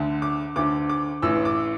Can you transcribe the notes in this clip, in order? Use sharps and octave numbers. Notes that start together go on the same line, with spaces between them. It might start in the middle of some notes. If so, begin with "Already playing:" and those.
Already playing: D2 D3
D6
D2 D3 D6
D6
A1 A2 E3 E6
D6